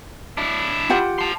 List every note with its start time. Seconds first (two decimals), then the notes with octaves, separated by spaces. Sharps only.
0.37 D4 E4
0.89 F4 G4 F#5
1.19 A5 C6